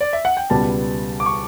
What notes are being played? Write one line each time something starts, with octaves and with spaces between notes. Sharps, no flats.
D5
E5
F#5
G5
C#2 B2 G3 B3 A5
D6
C#6